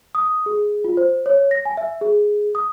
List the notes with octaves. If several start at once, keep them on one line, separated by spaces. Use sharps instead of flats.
D#6
G#4
F4
C5
C#5
A#6
G#5
E5
G#4
D#6